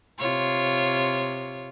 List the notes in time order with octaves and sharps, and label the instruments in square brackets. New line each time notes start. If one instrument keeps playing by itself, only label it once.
[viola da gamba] C3 F4 C#5